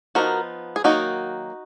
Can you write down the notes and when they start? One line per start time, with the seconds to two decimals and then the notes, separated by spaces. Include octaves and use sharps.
0.15 F3 B3 D#4 F#4 A#4
0.76 G#4
0.84 D#3 F#3 A#3 D#4 F#4